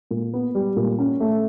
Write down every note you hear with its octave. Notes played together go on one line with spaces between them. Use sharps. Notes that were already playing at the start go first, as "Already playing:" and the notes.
A#2
B3
G3
A#2
C#4
A3